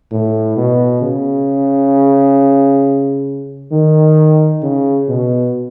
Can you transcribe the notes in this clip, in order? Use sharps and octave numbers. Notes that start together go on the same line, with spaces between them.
A2
B2
C#3
D#3
C#3
B2